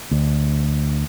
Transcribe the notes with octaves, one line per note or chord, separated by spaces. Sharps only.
D2